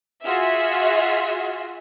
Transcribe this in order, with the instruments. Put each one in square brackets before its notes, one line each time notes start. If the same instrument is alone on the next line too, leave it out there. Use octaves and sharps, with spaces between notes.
[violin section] F4 F#4 G#4 E5